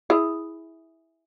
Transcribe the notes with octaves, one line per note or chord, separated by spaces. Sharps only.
E4 G#4